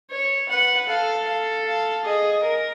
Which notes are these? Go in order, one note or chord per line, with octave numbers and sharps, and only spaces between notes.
C#5
B4 F#5
A4 F5
F5
F5
G#4 D#5
A#4